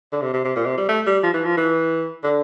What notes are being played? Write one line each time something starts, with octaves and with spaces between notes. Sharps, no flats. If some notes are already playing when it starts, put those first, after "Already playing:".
D3
C3
C3
C3
A#2
C3
G3
A3
G3
F3
E3
F3
E3
D3